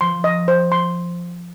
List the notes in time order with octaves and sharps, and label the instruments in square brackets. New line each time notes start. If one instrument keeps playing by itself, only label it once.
[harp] F3 [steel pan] C6
[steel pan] D#5
C5
C6